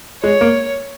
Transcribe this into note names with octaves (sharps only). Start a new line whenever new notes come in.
G#3 C#5
A#3